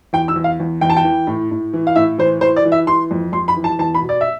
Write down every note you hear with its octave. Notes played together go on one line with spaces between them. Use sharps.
E2 G5
E6
E2
F5
E2
E2 G5
A5
G5
E3
A2
A2
E3
F5
A2 E5
E3 C5
E3 C5
D5
E3
E5
E3 C6
F2
F2 C6
B5
E3
A5
E2 A5
B5
B2
D5
E5